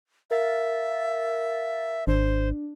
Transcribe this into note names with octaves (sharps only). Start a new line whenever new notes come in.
A#4 E5 F5 A6
G#1 D4 C5